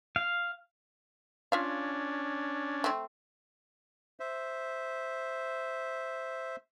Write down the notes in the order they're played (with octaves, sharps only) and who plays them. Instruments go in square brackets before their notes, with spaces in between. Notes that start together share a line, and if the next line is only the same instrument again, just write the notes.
[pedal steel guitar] F5
[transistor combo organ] C#4 D4 [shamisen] F4 E5 F5
[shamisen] A3 C4
[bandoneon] C5 E5